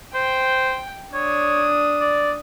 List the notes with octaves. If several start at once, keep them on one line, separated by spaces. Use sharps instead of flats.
C5 G5
D4 C#5 D#6
D5